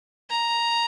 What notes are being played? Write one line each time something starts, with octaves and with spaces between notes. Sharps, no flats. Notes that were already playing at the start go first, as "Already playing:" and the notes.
A#5